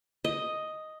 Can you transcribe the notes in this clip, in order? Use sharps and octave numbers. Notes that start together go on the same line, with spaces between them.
D#5